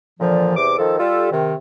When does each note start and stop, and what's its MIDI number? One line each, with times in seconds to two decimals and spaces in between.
0.19 0.55 46
0.19 0.55 50
0.19 0.55 52
0.19 0.55 53
0.56 0.77 40
0.56 0.77 48
0.56 0.77 86
0.78 0.96 51
0.78 0.96 53
0.78 0.96 69
0.98 1.28 55
0.98 1.28 65
0.98 1.28 67
0.98 1.28 69
1.32 1.54 48
1.32 1.54 51